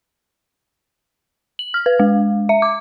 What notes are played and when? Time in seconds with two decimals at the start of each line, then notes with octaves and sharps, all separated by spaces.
1.59 F#7
1.74 F6
1.86 B4
2.00 G#3
2.49 E5
2.62 D6